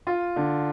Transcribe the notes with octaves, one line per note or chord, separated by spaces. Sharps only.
F4
D3